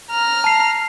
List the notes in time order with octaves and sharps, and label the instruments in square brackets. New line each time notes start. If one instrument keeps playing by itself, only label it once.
[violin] A#5 F6
[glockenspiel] A5 C7